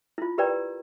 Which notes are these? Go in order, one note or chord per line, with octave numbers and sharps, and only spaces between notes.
E4 F4
G4 A#4 B4 D5 G5 A#5